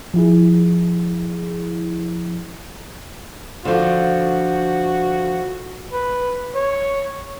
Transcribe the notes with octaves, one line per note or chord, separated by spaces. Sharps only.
F3 E4 G#4
D3 F3 F#4
B4
C#5